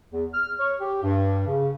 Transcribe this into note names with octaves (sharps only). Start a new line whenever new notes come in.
E2
F6
C#5
G4
G2
C#3